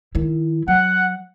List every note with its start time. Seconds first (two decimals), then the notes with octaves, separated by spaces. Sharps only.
0.15 D#3 E4
0.68 F#3 F#5